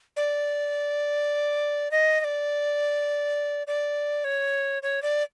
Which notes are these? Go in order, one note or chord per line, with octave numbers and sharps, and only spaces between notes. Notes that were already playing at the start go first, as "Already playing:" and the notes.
D5
D#5
D#5
D5
D5
C#5
C#5
D5